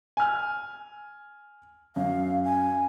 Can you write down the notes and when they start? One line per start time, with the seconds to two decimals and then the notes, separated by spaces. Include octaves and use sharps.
0.17 G#5 F6
1.96 F#2 F5
2.44 G#5